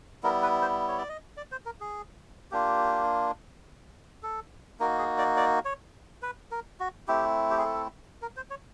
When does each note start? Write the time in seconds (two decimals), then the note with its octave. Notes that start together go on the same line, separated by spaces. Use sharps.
0.23 G3 B3 E4 A#4
0.43 B4
0.62 C5
0.88 C#5
0.98 D5
1.09 D#5
1.37 D5
1.52 C5
1.66 A#4
1.80 G#4
2.51 A#3 D4 F4 G4
4.23 A4
4.79 A#3 D#4 F#4 A#4
4.99 G#4
5.18 D5
5.37 D5
5.65 C#5
6.22 B4
6.51 A#4
6.80 F#4
7.08 A3 C4 E4 G4
7.50 G4
7.58 G#4
7.65 A4
8.22 A#4
8.36 C5
8.50 C#5